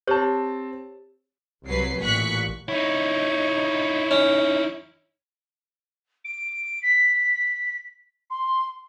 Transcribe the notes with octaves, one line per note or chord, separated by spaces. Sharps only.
C4 G4 C5 C#5 A5
C2 F#3 B4 C7
A1 A#2 C#6 F#6 B6
D#4 E4 C#5
C#4
D7
B6
C6